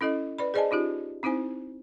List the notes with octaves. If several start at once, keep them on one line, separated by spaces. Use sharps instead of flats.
C#4 E4 A4 D#5
B4 D5 B5
G#4 C5 D5 D#5 G#5 A5
C#4 D#4 F4 G4
C4 D#4 E4 C5 G#5